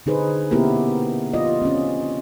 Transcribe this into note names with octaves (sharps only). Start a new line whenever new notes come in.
D3 D#4 G#4 B4 C5
A#3 B3 C#4 E4 G4 A#4
F4 D5 D#5
C4 C#4